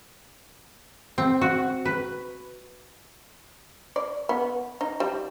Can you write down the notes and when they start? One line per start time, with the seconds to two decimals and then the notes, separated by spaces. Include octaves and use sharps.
1.18 C4
1.41 F#4
1.85 B4
3.96 D5
4.29 B3
4.81 D#4
5.00 G3